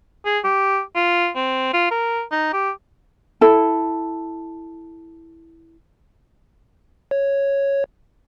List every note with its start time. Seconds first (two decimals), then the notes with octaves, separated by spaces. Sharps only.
0.25 G#4
0.44 G4
0.95 F4
1.36 C4
1.73 F4
1.91 A#4
2.32 D#4
2.53 G4
3.41 E4 A4
7.11 C#5